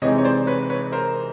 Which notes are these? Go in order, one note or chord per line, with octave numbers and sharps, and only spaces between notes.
C3 E3 G#3 C4 D#4 C#5 D#5
C#5
C5 D5
B4 C#5
B4 C#5
A#4 C5